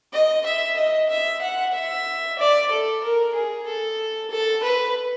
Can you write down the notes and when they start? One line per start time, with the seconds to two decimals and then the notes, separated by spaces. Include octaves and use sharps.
0.13 D#5
0.45 E5
0.77 D#5
1.10 E5
1.41 F#5
1.74 E5
2.39 D5
2.71 A4
3.03 A#4
3.34 G#4
3.67 A4
4.30 A4
4.63 B4